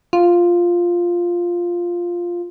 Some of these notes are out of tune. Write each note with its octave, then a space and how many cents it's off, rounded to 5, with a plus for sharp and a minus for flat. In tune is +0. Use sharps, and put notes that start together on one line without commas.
F4 +0